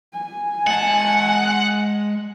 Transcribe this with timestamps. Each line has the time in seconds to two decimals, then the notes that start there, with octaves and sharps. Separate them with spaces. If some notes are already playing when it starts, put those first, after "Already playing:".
0.14 G#5
0.67 G#3 F#5 A5